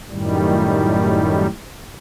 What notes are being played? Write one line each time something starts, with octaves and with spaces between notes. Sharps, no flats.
F#2 A2 D#3 G3